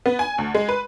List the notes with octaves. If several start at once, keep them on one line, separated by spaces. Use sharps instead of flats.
B3
G#5
D2
G#3
B4